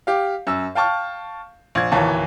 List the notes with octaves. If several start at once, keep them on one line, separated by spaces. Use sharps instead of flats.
G4 F5
F#2 E6
F5 G5 A5 C#6 F6
A#1 G#6
D1 D#2 E3 C#5 A5